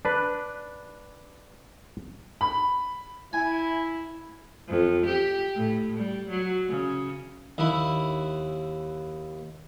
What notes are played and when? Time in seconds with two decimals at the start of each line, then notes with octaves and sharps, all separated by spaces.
0.05 D4 B4
2.41 B5
3.33 E4 G#5
4.68 F2
5.06 G4
5.56 A2
5.97 G3
6.30 F#3
6.69 C#3
7.58 D#2 E4